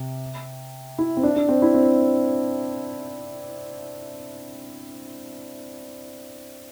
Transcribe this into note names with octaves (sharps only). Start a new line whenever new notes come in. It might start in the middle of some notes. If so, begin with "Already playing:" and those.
Already playing: C3
E4
C4
D4
D4
C4
E4
C4